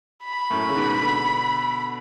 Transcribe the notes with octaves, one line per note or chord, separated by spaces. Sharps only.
B5
F#2 A2
C#3
G#2 B2
B2 D3